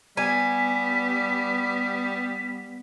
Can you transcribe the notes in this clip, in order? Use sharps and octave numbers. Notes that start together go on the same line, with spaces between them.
G3 B3 G#5 B6